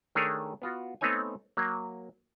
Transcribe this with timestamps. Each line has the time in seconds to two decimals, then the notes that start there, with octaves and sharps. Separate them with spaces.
0.15 D#3 A3 D4 G#4 A#4 C#5
0.62 B3 F4 F#4
1.01 A3 B3 C4 D#4 C#5 G#5
1.57 F#3 A#3